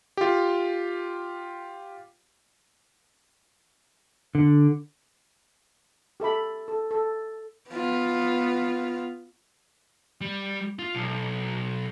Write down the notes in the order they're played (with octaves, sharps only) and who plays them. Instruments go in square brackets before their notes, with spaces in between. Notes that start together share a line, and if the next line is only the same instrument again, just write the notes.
[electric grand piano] F4 G4
[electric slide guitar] D3
[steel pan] G4 A4 E5 B5
A4
A4
[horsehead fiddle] B3 F4
[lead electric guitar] G3
F4
B1